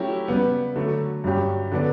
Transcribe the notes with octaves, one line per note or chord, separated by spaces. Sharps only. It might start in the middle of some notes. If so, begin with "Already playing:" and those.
Already playing: F#3 A3 C#4 E4 G4
C#3 G3 B3
D3 F#3 A3
G2 F#3 C#4 G4
D3 F#3 B3 D4